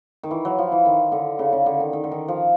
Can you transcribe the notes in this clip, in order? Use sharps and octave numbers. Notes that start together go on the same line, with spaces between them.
D#3
E3
F#3
F3
E3
D#3
D3
C#3
C#3
D3
D#3
D#3
D3
D#3
F3